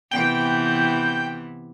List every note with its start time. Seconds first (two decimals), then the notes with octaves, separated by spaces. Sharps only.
0.11 C3 E3 B3 G5